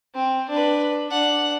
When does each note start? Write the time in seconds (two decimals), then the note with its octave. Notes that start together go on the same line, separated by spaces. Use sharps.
0.14 C4
0.49 D4 B4
1.09 D4 F#5